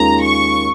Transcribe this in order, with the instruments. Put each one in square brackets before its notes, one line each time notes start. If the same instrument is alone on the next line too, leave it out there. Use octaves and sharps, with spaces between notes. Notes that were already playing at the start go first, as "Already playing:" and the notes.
Already playing: [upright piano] D#2 D#3 G#3 C#4 F4 [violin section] A#5
[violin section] C#6